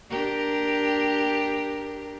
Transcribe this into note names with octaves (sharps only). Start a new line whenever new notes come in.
D4 G4 A#4